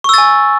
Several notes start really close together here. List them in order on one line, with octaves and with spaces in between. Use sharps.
C#6 E6 A6 G#5